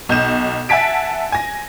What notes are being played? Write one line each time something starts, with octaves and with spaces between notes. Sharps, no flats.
B1 G6 E7
E5 F#5 G#5 A5 B6 D7
G#5 A#6